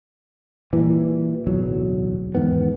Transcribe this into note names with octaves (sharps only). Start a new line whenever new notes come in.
A#2 E3 G3
D1 B1 E2 F#3
E2 G#2 D#3 B3